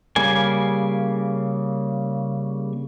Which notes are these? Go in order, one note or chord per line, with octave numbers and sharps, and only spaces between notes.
C#3 G3 A#3 G#5